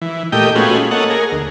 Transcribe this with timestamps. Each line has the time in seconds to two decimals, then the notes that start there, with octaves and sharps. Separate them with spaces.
0.02 E3
0.32 A#2 A3 G4 D#5 G5
0.55 A3 B3 C#4 F4 F#4 G#4
0.91 A#3 A4 C#5 D#5 F#5
1.10 G#4 A#4
1.32 D2